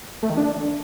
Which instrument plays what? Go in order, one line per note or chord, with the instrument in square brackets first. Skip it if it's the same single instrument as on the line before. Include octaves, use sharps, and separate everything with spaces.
[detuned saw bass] A3
D#3
D4